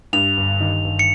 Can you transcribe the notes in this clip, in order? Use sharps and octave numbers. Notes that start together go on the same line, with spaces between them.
G2 F7
G1
D#3
G1
C#7